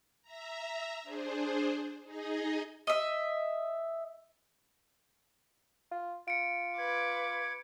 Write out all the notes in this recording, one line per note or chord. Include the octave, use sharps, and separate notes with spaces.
E5 A#5
D4 G#4 C5
D#4 G#4 D#5
D#5 E5
F4
F4 C#7 D7
B4 D6 G#6